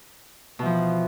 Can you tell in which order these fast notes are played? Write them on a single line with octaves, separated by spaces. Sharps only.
B2 E3 F3